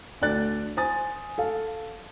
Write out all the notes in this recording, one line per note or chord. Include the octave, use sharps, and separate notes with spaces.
D2 A4 D5 F#6 A6
C5 G#5 D#6 A6
A4 F5